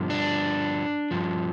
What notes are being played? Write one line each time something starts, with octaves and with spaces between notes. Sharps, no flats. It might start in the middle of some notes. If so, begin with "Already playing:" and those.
Already playing: G2 D3 F3
D4
G2 F3